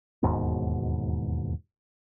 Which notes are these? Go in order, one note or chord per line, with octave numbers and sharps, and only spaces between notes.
E1 D#2 G#2 B2